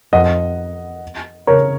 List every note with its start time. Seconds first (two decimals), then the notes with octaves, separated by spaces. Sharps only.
0.13 F2 D#5 F#5
1.47 C#3 A#4 C#5